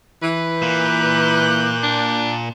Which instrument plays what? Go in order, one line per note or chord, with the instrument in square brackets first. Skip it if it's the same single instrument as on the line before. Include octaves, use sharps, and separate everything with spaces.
[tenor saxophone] E3 [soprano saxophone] B4
[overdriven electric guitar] A#2 [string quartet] D6 F#6 G6
[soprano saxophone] D4